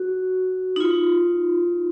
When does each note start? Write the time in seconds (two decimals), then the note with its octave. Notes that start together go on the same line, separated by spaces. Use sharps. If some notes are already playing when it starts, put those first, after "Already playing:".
Already playing: F#4
0.76 D#4
0.80 F4